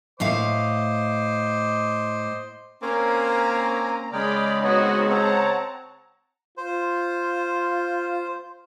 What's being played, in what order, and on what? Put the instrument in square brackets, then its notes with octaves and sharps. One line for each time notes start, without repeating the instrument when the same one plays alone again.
[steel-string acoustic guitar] A2 A3 F5 [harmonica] C5 D#5 D6
[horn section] A#3 C4 C#4 [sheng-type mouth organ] G#5 D6 [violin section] A#5
[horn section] C#3 G#3 [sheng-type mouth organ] G#4 G5 F6 [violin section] D5 B5
[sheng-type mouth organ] B3 C#5 D#5 [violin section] C4 D#4 F#4
[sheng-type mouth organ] C4 C#5 [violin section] F#5 A5 A#5
[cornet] F4 [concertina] C5